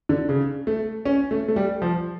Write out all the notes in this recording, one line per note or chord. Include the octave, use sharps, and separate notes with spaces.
D3
C#3
A3
C#4
A3
A3
G3
F3